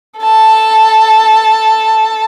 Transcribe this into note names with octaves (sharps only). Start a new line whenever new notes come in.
A4 A5